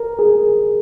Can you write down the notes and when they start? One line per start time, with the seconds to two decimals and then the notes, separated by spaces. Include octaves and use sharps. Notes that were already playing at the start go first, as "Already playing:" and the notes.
Already playing: A#4
0.19 G#4